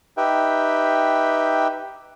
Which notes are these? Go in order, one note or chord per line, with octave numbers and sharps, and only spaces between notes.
D#4 G4 B4 E5 G5